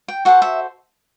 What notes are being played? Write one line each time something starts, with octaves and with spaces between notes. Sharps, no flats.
G5
F#4 A4 C5 F#5
E5